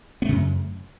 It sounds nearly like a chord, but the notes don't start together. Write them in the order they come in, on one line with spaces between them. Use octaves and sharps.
B3 A3 C#3 F#2